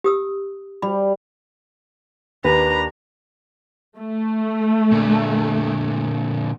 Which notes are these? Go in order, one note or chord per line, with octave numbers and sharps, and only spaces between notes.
G4 D#6 E6
G3 B5
D#2 D4 B4 A#5
A3
A#2 D3